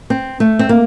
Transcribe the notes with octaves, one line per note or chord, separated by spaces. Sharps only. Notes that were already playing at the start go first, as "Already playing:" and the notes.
C4
A3
C4
A#3